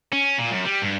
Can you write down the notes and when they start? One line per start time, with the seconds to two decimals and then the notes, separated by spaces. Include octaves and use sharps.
0.12 C#4
0.38 A#2
0.51 F#2
0.65 G3
0.82 G2